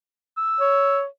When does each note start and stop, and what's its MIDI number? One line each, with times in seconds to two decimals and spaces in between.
0.38 0.99 88
0.60 1.05 73